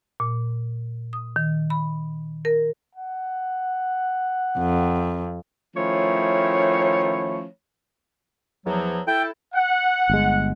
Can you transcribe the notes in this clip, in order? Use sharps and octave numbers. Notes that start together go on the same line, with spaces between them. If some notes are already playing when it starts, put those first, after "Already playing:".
A#2
D#6
D#3
B5
A#4
F#5
F2
D#3 F3 A3 C#4 E4 C#5
E2 F3 F#3
E4 A4 G5
F#5
G1 G#3